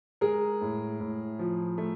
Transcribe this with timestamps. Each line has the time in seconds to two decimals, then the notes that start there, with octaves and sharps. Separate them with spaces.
0.21 G#3 G#4 A#4
0.61 A2
1.00 A2
1.39 F3
1.78 A3